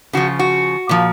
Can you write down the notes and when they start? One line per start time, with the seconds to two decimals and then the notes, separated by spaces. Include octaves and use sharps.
0.13 C#3 F3 F#4
0.39 F#4
0.89 A#2 F3